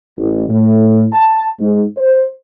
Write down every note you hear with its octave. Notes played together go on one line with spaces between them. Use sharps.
A1
A2
A5
G#2
C5